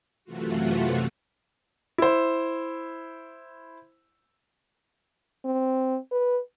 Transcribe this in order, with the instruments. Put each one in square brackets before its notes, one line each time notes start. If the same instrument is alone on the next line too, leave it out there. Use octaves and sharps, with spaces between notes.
[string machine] F#2 C3 E3 A3 F4 F#4
[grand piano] E4 C5
[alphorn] C4
B4